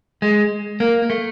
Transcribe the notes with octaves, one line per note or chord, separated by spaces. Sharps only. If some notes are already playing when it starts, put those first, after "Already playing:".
G#3
A#3
A3